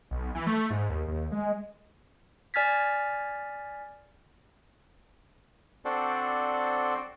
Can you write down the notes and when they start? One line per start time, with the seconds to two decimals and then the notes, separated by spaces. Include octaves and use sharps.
0.11 B1
0.35 E3
0.47 A3
0.70 G#2
0.89 D#2
1.08 D#2
1.32 G#3
2.54 D5 G#5 F6 G#6 A6 B6
5.85 C4 D4 F#4 A4 C5 D5